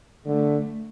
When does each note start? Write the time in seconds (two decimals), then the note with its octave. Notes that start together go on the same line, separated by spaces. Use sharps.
0.26 D3 A3